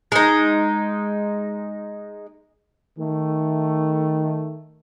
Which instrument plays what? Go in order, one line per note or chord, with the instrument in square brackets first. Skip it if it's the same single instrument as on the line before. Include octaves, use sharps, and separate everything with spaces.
[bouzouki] G#3 D#4
[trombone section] D#3 A3